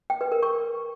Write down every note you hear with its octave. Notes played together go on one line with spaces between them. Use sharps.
G5
B4
A#4
C#6